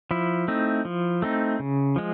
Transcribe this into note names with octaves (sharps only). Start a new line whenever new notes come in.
F3 E4
A3 C4 D#4
F3
A3 C4 D#4
C#3
F3 G#3